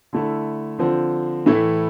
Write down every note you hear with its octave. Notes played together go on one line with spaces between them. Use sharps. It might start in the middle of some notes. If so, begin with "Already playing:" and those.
D3 A3 E4
D3 F3 C4
A2 E3 A3 E4